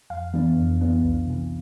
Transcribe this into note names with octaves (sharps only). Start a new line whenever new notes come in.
F2 F5
E3 B3 D4
F2
E3 B3 D4
C2
C3 E3